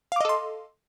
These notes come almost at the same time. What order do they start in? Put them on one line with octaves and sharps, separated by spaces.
F5 D6 D#5 A4 C6